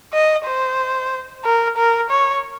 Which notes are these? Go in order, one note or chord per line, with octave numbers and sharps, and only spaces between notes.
D#5
C5
A#4
A#4
C#5